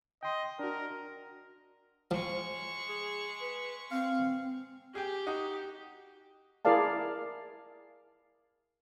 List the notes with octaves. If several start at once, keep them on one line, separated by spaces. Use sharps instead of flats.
D#5 G5 C6
D4 F#4 A#4
F3 G#3 C#6
G#4
B4
C4 F5
G4 G#4 G5
D#4 F#4 D#5
E4 G#4 A#4 D5 F5 A5